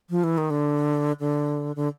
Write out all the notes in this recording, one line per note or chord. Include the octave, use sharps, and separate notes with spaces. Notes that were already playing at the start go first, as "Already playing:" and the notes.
F3
E3
D#3
D3
D3
D3